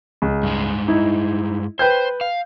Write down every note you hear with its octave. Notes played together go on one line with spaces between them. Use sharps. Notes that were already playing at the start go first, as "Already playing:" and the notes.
C#2
G2 G#3
D#4 E4
B4 C5 G5 G6
F5